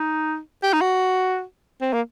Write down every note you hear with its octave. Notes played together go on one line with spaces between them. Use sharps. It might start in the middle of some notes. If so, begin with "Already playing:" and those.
Already playing: D#4
G4
D#4
F#4
C4
A#3